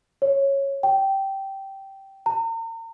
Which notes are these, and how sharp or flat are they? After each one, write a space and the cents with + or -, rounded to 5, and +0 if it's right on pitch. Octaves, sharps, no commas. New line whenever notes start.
C#5 -10
G5 -10
A#5 -40